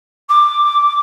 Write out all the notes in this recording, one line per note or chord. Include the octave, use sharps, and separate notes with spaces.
D6